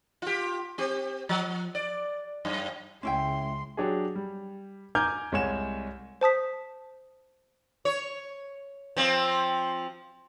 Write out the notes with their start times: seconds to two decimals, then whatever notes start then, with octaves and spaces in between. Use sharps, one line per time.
0.22 F4 G4
0.78 C4 G4
1.29 F3
1.75 D5
2.45 F#2
3.03 C#2 G#3 C#4 E4 G5 C6
3.77 F#3 D4 G4 G#4
4.15 G3
4.95 G#5 A#5 D6 F6 G6 G#6
5.32 C2 G#3 C#5 G#5 E7
6.21 C5 A5 D#6 B6
7.85 C#5
8.97 F3 C4